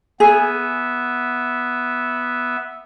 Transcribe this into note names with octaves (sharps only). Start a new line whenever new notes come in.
B3 G#4 E5